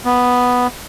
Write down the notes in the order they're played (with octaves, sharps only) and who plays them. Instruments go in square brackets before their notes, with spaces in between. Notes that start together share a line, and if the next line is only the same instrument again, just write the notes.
[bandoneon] B3